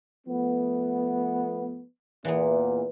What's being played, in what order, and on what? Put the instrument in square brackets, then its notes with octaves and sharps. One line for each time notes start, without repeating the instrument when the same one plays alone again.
[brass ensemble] F3 A3 B3
[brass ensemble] E2 A#2 [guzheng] E3 B3